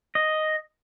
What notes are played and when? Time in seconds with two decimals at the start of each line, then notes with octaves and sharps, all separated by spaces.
0.15 D#5